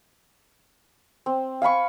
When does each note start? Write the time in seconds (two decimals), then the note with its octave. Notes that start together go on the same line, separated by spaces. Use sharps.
1.26 C4
1.62 F5 G#5 B5 C#6